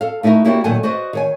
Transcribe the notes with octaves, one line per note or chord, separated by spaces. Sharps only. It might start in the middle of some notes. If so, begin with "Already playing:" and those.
A4 F5
A3 D#4 E4 F#4 A#4
A#3 E4 F#4 G4 C#5 D5
A#2 D#3 F#3 A4 F#5 G#5
F#4 B4 C5 D5 D#5
D#3 C#5 G#5